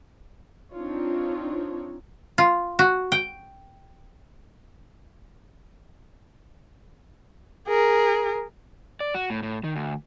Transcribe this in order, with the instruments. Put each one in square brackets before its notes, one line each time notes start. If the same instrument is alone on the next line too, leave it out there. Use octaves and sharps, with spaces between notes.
[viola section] C4 D4 D#4 F4 C#5
[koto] F4
F#4
G5
[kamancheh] G#4 A#4
[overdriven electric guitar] D5
F#4
A2
A2
D#3
D2